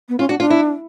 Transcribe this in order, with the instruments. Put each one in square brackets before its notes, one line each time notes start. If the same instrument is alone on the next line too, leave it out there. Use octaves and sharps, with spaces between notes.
[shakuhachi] B3
[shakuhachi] C#4 [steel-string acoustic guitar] F4
[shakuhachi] D4 [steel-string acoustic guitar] F#4
[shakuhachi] D4 [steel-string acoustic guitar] F4
[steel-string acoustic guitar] E4